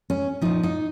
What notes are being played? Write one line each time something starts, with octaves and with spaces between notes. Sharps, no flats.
C#4
A#2 F3 D#4
D#4